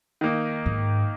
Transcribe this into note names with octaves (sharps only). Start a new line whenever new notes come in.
D#3 A#3 D#4
G#2